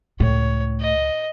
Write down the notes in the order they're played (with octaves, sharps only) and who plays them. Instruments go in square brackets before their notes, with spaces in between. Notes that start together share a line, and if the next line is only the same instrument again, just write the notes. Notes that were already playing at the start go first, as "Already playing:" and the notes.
[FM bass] C#2 [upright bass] A2 [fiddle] C#5
[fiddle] D#5